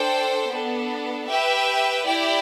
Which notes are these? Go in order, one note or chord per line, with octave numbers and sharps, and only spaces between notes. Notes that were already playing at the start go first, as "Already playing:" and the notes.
Already playing: D4 A4 C5 G5
B3 D4 A4
G4 B4 E5 G5
E4 G4 D5 G5